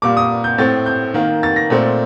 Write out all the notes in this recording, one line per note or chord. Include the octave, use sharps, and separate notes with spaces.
A#2 G3 A#3 D6
D#6
G6
A2 A3 C4 A6
G6
D#3 A#3
A6
A#6
A#2 A3 C4